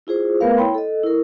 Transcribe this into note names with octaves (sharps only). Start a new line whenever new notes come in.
E4 F4 G#4 C5
A3 B3 A#4 B4 F5
E4 C#5 G5 B5 C6
A4 D#5
E4 A#4